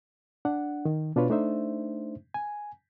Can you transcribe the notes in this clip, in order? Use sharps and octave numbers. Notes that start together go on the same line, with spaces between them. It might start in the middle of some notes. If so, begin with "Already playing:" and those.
D4 F#5
D#3
B2 D4 F4 B4 C#5
A3 D4 D#4 C5 E5
G#5